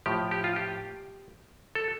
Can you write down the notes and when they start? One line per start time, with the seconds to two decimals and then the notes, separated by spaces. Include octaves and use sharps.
0.06 A2 F3 G4
0.31 G4
0.44 F4
0.56 G4
1.75 A4